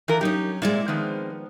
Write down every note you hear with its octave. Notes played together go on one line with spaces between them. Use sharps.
E3 F3 A#4
F#3 C#4 D#4 G4
A#2 G#3 C4 E4 C5 D5
D#3 F3 B3